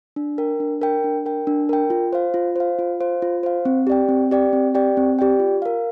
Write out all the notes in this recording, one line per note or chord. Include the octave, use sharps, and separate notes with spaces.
D4
A#4 G5
D4
A#4 G5
D4
A#4 G5
D4
A#4 G5
F4
C5 F5
F4
C5 F5
F4
C5 F5
F4
C5 F5
C4
G4 D5 G5
C4
G4 D5 G5
C4
G4 D5 G5
C4
G4 D5 G5
F4
A#4 F5